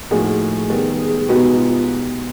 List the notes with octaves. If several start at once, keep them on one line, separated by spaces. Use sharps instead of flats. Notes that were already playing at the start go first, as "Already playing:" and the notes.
A2 F3 A#3 D#4 F#4 G#4
D#3 G3 B3
B2 G#3 B3 D#4 F#4 G4
F4